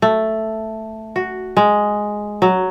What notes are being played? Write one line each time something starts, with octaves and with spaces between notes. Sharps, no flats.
A3
F#4
G#3
F#3